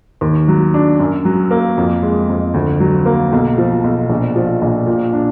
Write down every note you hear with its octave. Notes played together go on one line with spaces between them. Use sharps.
D#2
F#3
D4
F#2
F#3
A#3
F2
G#3
F2
D2
F#3
A#3
B1
F3
B1
A#1
F3
A#1
A#2
D4